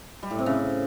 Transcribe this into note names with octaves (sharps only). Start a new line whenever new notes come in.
G3
A2
C3
C#3